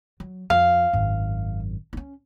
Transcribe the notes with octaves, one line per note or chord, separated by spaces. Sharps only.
F#3
F2 F5
G#1 F#2
C#4 D4